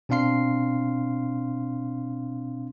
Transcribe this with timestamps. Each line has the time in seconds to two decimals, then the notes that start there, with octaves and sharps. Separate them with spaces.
0.09 B2 C4 D4 F5 C6 C7